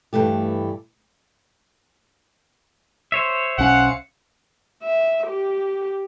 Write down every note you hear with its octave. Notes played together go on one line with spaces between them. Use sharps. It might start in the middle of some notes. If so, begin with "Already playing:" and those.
G2 E3 A3 G4
C5 C#5 E5
B1 C#4 F5 F#5 C#7
E5
G4